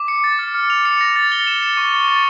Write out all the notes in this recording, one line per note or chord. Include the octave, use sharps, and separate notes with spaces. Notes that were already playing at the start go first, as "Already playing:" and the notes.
Already playing: D6
C#7
A6
F6
F6
F7
C#7
A#6
A6
G7
E7
C#7
C#6
C#6
A6